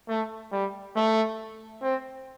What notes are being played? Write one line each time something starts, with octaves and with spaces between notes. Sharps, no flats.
A3
G3
A3
C4